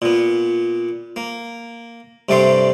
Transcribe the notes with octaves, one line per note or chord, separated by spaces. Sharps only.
A#2 B3
A#3
G2 C3 A3 D5 C6